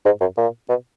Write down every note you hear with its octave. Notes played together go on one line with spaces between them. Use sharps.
G#2
F#2
A#2
B2